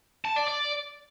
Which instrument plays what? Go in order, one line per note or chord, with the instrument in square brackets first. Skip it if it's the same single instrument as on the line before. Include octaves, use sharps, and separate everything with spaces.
[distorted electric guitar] A5
D5
D5